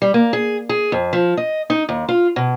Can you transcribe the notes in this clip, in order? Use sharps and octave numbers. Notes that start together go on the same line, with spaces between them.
G3
A#3
G#4
G#4
F2
F3
D#5
D#4
D#2
F4
B2